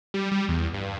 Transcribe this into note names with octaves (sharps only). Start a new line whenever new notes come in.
G3
G3
E2
G2